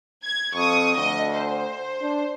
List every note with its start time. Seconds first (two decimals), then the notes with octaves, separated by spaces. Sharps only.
0.23 G#6
0.54 F2 C#6 D#6
0.96 D2 D#5
1.33 C5
2.01 D4